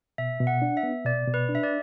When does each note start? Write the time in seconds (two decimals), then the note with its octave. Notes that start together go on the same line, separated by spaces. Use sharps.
0.18 B2 E5
0.40 B2
0.47 F#5
0.62 D4
0.77 E5
0.83 B3
1.05 B2 D5
1.27 B2
1.34 B4
1.49 D4
1.55 E5
1.63 D5